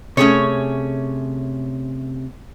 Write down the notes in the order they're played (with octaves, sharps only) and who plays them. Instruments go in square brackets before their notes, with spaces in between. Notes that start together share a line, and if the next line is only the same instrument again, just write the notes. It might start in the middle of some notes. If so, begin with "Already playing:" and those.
[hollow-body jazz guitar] C3 A3 [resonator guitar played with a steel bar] C#4 G#4 C#5